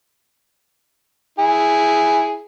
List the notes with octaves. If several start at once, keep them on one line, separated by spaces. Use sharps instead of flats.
E4 G#4